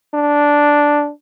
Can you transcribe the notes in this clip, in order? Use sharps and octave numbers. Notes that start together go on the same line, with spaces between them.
D4